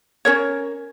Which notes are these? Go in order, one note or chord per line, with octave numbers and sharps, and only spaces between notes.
C#4 A#4 C#5